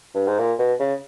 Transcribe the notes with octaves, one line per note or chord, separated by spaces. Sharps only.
G2
G#2
A#2
B2
C#3